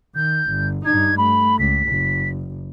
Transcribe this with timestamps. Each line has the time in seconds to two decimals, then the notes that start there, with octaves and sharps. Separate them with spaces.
0.16 D#3 G6
0.49 G1
0.86 G2 D#4 G#6
1.18 A3 B5
1.59 C#2 B6
1.88 F#1